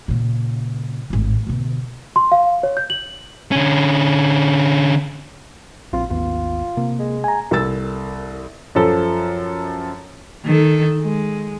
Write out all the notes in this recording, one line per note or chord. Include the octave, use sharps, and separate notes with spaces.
A#2 C#3
G#1 A2
B2 D3
C6
F5
C#5
G6
F#7
D3 C#4
A#1 A#2 C4 F4
G#1 D#2 B3 F4
C3 A#3
G#3
G#5 A#5
C2 A4 A#4 E6 A6
F#2 F3 A4
D#3 A4
G#3